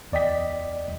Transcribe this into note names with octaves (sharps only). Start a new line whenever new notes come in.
E2 D5 D#5 G5 B6